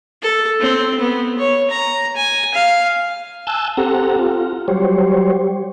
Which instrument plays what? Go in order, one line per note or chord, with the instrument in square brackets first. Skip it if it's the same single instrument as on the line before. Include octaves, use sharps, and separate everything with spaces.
[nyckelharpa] A4
C4
B3
C#5
A#5
G#5
F5
[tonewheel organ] G#5 A5 E6 F#6 G6
C4 G4 A4 F#5 A#5
F4
F#3 G3 G4 C5 C#5